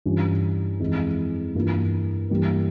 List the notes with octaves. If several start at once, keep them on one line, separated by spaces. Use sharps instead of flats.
G2 E3 G3 C#4 F4
F2 E3 G#3
G2 E3 A#3 F4
G2 E3 G3 A#3